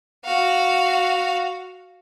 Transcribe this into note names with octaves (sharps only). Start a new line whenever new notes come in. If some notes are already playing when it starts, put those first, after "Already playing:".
F#4 F5